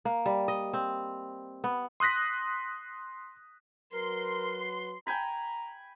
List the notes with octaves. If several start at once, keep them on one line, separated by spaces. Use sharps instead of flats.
A#3
G3
D#5
C4
B3
C6 D#6 F#6 A#6 B6
F#3 A#4 B4 C6
G5 G#5 A#5 B5